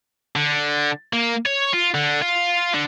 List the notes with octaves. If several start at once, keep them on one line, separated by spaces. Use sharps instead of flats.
D3
A#3
C#5
F4
D3
F4
D3